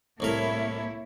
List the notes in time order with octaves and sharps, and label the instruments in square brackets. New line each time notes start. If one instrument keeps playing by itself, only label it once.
[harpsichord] C2 A2 A#4 [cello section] A#3 E4 C#5